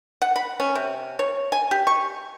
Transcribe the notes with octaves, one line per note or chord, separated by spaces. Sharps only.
F#5
B5
C#4
C3
C#5
G#5
G4
C#6